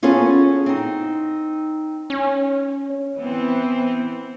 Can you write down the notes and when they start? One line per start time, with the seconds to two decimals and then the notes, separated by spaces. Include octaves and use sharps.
0.03 B3 C#4 F4 G#4 A4 C#5
0.66 C4 D#4
2.10 C#4
3.16 E3 B3 C4